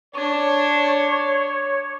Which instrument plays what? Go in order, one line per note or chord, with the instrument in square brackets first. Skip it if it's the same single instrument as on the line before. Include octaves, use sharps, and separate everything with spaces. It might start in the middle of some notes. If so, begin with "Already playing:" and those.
[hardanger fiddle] D4 [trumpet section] C#5 [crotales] C#6 D6 G#6